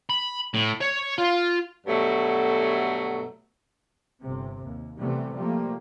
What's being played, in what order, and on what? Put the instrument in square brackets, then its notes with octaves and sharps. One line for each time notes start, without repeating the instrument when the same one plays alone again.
[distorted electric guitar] B5
A2
C#5
F4
[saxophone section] G2 B2 F#3 A3
[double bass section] G1 C3
D#2
C3 E3 G3 A3 B3
F3 G3 A3 A#3